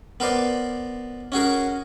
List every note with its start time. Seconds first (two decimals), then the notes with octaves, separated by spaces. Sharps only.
0.20 B3 A#4 C5 D5
1.32 C#4 F#4 G#4 A#4